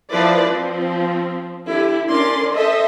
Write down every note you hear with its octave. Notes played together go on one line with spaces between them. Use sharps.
F3 E4 B4 C5 D5
F3 C4
D3 E4 G4
D3 C#4 A#4 D5 C6
A4 C5 D#5 E5